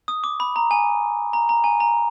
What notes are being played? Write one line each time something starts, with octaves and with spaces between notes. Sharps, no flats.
D#6
D6
B5
A#5
G#5
A#5
A#5
G#5
A#5